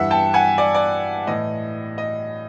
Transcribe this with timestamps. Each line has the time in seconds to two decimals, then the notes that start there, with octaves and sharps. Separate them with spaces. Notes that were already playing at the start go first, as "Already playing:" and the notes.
Already playing: G2 E3 E5 F#5
0.11 G5 A5
0.34 F#5 G#5
0.58 D5
0.75 D5
1.27 A2 E3 D#5
1.98 D#5